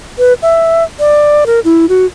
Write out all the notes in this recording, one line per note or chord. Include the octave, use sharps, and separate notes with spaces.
B4
E5
D5
A#4
E4
F#4